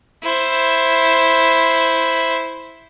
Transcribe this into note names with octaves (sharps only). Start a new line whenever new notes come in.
E4 C5